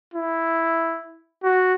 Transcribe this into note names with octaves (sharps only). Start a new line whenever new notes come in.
E4
F#4